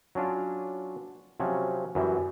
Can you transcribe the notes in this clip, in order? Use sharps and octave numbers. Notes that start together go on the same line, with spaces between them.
F#3 C#4 D4 F4
C3 F3 F#3 C#4
F#2 E3 F#3 G3